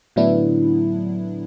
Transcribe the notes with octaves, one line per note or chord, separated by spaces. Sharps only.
A2 D3 F#3 B3 D4 E4